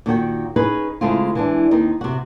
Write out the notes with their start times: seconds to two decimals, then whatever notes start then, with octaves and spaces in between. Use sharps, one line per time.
0.06 A#2 D#3 F#4 G5
0.56 C#4 D#4 G#4 B4
1.01 C#3 G#3 A3 C4 E4 F4
1.35 E3 G#3 D4
1.71 D#2 C4 D#4
2.01 C3 F#4